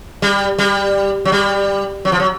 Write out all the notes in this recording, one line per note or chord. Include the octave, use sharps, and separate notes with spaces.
G3
G3
F#3
G3
F#3
F3
F#3